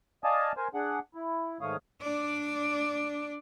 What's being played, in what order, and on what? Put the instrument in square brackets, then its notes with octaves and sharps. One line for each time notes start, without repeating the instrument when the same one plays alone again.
[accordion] D5 D#5 F5 G#5 A5 D#6
A#4 C5 G#5
D4 G#4 F#5
E4
G#2 D#3 A3 C#5 F5 D#6
[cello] D4 D5